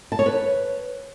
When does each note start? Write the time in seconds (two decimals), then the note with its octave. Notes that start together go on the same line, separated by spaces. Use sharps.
0.12 A5
0.19 C#5
0.26 B4